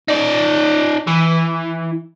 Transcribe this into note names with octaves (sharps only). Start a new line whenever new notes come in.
D#4 D5
E3